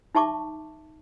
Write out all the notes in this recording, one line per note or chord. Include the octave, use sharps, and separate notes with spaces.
D#4 E5 A5 C#6 D6